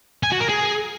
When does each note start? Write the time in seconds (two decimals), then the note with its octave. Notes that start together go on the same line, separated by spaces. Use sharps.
0.23 G#5
0.32 F#4
0.40 A#4
0.49 G#4